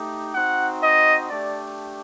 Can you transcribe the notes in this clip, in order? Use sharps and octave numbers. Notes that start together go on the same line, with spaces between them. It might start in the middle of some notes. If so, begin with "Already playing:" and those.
Already playing: A3 D#4 G4
C4 D#4 F#4 F#5
D#5
A3 D4 G4 D5